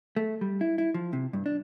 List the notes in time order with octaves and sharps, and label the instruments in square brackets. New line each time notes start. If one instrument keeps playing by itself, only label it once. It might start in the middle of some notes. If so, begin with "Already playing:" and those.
[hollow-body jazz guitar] A3
G3
E4
E4
F3
C3
G2
D4